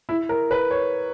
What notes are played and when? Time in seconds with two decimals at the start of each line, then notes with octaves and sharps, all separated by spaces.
0.09 E4
0.29 A#4
0.51 B4
0.71 C#5